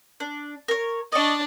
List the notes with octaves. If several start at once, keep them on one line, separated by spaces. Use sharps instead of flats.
D4
A#4 C#5
D4 D5 D#5 C#6